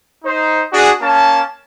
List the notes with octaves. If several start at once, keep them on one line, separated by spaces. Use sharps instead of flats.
D#4 C5
D4 F#4 G#4
A#3 C#4 A5